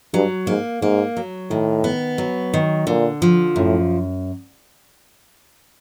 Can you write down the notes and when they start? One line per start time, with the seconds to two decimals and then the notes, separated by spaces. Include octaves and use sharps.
0.14 G2 F#3
0.47 G#2 A#3
0.82 G#2 A#3
1.17 F#3
1.50 A2 D#3
1.84 B3
2.18 F#3
2.54 D#3
2.87 A#2 D3
3.22 F3
3.56 F#2 A2